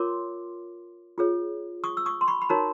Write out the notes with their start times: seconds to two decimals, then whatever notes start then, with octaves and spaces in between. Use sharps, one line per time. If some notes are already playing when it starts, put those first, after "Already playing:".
Already playing: F4 A#4 C#5 C6 D6
1.18 F4 G#4 C#5
1.84 C#6 D#6
1.97 E6
2.06 C#6 D#6
2.21 C6
2.28 B5 C#6
2.42 B5
2.49 D#4 F#4 A#4 C#5 A#5 C6